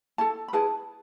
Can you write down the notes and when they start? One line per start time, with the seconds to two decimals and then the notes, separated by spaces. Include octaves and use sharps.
0.18 E4 A4 A5
0.48 B5
0.53 E4 G#4 B4 A5